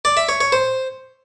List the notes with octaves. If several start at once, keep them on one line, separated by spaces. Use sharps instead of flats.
D5
E5
C#5
C#5
C5